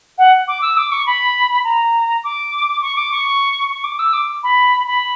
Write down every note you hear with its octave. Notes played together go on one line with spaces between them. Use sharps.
F#5
D6
E6
D6
C#6
B5
A#5
D6
C#6
D6
C#6
C#6
D6
E6
D6
B5
B5